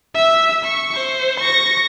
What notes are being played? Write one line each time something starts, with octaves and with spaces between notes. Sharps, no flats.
E5 E6
C#6
C5
C#6 A#6